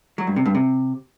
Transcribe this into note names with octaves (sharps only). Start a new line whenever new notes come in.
F#3
G2
C3
G2
C3